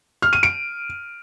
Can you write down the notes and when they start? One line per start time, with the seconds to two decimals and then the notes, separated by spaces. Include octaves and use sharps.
0.22 F6
0.33 D#7
0.43 D7